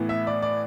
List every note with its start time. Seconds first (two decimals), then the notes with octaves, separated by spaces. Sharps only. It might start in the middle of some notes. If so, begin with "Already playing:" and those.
Already playing: A2 E3 B3 E4
0.09 E5
0.27 D5
0.42 D5